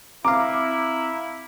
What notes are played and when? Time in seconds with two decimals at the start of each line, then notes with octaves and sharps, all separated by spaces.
0.25 C4 E4 F5 A#5 D6